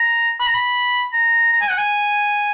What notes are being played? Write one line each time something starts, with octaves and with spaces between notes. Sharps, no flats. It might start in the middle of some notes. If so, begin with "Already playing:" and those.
Already playing: A#5
B5
A#5
B5
A#5
A#5
G#5
F#5
G#5